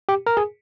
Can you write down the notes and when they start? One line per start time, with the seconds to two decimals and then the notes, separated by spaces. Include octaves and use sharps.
0.09 G4
0.27 A#4
0.37 G#4